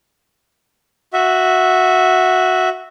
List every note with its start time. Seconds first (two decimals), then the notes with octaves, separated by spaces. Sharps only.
1.13 F#4 E5